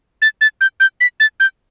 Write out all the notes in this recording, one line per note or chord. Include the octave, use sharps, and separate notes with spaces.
A6
A6
G6
G6
B6
A6
G6